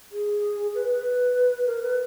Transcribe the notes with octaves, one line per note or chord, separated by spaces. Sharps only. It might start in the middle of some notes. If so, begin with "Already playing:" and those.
G#4
B4
B4
A#4
B4